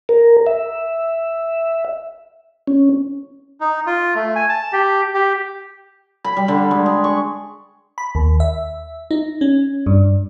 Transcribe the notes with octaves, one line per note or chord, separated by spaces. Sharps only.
A#4
E5
C#4
D#4
F4
A3
G#5
A5
G4
G4
B5
G3
D3
G#3
G#4
C#6
B5
D#2
E5
D#4
C#4
G2